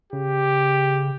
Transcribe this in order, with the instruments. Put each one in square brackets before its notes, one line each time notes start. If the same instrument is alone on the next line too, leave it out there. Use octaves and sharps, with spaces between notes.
[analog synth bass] C#3 [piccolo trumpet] G4